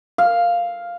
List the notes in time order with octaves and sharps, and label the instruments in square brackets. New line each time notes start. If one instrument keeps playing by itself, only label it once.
[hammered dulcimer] F5